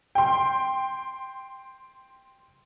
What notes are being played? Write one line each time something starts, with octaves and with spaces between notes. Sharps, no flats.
G5 C6